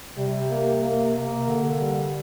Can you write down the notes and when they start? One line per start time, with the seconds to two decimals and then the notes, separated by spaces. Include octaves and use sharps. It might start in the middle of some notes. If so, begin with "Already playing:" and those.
0.16 C3 G3
0.50 A#3
0.82 A#3
1.15 A#3
1.47 D3
1.80 G3